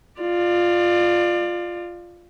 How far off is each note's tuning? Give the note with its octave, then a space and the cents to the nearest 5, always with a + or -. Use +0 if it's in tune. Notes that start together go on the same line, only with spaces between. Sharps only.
F4 +0 D5 +30